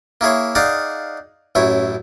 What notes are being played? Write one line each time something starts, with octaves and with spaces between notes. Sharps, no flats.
A#3 E4 G#4 C#5
D#4 G#4 D5 F5 F#5
A1 F#2 E4 C#5